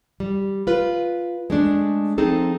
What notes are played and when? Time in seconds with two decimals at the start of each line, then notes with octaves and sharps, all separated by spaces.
0.20 G3
0.67 F4 B4
1.50 G#3 A3 D4
2.18 F3 C4 D#4 G#4 A4